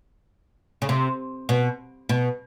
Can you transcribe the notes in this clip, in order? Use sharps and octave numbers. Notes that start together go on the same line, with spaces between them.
C#3
C3
B2
B2